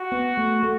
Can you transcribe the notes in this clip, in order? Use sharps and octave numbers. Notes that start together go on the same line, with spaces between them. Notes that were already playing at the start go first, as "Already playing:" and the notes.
Already playing: F#4
B3
A3
A3